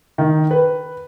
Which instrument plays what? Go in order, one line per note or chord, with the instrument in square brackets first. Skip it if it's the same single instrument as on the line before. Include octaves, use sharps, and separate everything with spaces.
[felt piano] D#3
B4